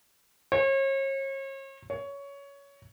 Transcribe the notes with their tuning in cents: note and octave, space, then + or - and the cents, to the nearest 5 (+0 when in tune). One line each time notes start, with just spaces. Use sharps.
C#5 -40
C#5 +15